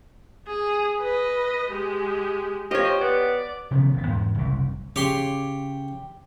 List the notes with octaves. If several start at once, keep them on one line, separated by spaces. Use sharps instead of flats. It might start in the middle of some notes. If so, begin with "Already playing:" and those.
G#4
B4 D#5
G#3 G4
F3 G4 C#5 D#5
C5
B3 D5
C3 D#3 F3 B3
D#1 B3
E2 G#2
F#1 C2
C#3 G4 C#5 C6